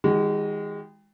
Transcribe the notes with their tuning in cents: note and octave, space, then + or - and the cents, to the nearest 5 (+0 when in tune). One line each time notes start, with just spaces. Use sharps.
D#3 +40 G#3 -20 F#4 +35